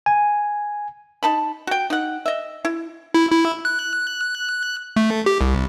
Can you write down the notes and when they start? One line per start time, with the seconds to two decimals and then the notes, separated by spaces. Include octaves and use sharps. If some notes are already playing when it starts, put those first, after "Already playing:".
0.06 G#5
1.23 D#4 A5 B5
1.67 F#4 G5
1.90 D#4 F#5
2.26 D#5 E5
2.65 E4
3.14 E4
3.31 E4
3.65 F#6
4.96 A3
5.26 G4
5.41 C2